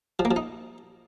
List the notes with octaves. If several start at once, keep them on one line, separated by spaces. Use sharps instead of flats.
F3
A#3
F3
D#4